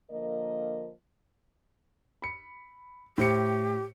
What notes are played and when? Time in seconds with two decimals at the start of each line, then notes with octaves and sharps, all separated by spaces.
0.11 D3 F3 A#3 A#4 D#5
2.22 B5 C#7
3.18 A2 G4 C5 C#7